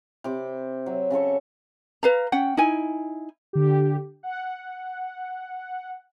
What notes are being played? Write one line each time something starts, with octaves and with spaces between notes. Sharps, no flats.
C3 C5 B5 D6
F#3 E5
C#3 C#4 A4 C#6
B4 F5 A#5
C#4 F#5 G5
D#4 E4 G#5
D3 G4
F#5